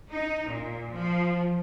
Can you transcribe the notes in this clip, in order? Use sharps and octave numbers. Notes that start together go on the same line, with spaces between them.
D#4
A#2
F3